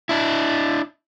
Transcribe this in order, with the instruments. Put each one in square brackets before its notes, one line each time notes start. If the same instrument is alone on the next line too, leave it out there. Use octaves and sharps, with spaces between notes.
[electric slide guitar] D4 E4